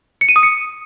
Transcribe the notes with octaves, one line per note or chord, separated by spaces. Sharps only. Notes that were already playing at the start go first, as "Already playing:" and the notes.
C#7
D#7
D#6
C#7